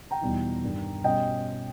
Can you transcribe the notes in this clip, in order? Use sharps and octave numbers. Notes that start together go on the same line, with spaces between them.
G5 A#5
E2 B2 G3 B3 D#4
G2 D#3 G3
B2 G3 C#4 D#5 G5